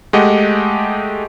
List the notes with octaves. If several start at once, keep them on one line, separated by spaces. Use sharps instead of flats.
G#3 A3 G4 D#5 F#5